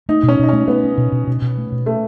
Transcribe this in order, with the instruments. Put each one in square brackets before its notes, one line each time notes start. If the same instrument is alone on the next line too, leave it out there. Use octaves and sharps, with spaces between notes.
[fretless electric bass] A3 [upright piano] D#4
[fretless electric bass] B2
[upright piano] C#4
[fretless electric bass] B2 [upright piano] D#4
[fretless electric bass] A3 [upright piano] C#4
[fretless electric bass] A3 [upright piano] B3
[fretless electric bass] C#4
B2
B2
B2
B2
A3
B2
[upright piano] A3 [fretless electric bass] C#4